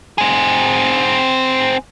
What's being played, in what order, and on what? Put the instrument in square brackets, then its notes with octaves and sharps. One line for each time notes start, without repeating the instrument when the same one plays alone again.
[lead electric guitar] C4 G#4